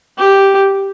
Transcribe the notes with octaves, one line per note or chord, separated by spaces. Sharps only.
G4